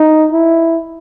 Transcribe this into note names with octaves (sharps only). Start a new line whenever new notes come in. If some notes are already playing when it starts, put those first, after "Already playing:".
Already playing: D#4
E4